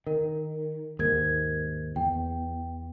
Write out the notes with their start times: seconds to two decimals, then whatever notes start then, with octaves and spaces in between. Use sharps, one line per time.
0.07 D#3 A#4
0.99 D#2 G#2 A#4 G#6
1.96 E2 G5